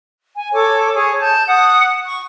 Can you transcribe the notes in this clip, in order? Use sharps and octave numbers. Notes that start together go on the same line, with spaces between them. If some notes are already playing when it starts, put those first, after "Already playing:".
G#5
A4 C#5 D6
G#4 C#5
A5 G6
F#5 D#6
C#6